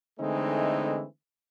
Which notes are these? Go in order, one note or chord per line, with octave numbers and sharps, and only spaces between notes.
D3 E3 G#3 A3 C4 D#4